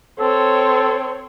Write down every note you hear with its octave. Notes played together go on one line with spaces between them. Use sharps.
C4 A4 C#5